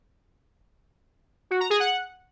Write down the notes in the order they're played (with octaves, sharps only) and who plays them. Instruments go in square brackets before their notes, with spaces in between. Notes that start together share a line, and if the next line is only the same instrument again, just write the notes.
[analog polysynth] F#4
A#5
G#4
F#5